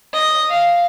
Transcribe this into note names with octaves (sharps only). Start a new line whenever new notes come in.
D#5
F5